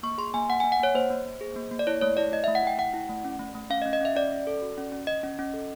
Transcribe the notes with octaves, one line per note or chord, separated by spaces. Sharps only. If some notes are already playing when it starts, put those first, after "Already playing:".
A#3 C#6
G#4 C6
A#3 G#5
A#3 F#5
A#3 G#5
F#5
A#3 C#5
A#3 C5
A#3
A#3
G#4
A#3
A#3
D5
E4 C#5
A3 C#5
E4 D5
E4 D#5
A3 E5
F#5
E4 G5
A3 F#5
E4
A3
C#4
A3
A3
C#4 F5
D#5
C#4
D#5
C#4 E5
C#4 D5
C#4
A4
F#4
C#4
C#4
C#4 D#5
C#4
C#4
A4